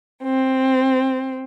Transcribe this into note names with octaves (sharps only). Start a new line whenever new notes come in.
C4